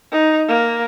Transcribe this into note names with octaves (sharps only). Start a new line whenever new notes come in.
D#4
A#3